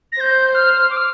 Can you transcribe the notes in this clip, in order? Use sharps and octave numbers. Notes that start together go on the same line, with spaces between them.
A#6
C5 G6
F6
D6
F6